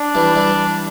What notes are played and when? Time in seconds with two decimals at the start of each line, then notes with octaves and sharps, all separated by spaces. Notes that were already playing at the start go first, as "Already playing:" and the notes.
Already playing: D4
0.15 E3 G3
0.35 E3 G3